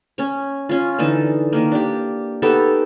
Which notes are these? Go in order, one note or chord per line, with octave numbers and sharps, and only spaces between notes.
C#4 C#5
C#4 F4
D3 E3 D#4 A4
D#3 A#3
D4 G4
B3 D#4 G4 A4